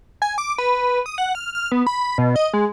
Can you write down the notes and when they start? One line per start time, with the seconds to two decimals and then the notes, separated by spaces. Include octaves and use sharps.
0.22 G#5
0.38 D6
0.58 B4
1.06 D#6
1.18 F#5
1.35 F6
1.55 F6
1.72 B3
1.86 B5
2.18 B2
2.36 D#5
2.53 G#3